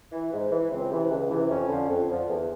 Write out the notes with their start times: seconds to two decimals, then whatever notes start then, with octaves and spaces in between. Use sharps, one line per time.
0.11 E3
0.32 G#2
0.51 E3
0.70 C#2 C4
0.90 C3 E3
1.10 C#2
1.29 C3 E3
1.49 F2 C#4
1.69 D3 F3
1.88 F2
2.08 D3 F3
2.28 E2